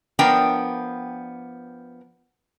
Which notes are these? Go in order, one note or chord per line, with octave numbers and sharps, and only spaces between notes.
F3 B3 D4 A#4 G5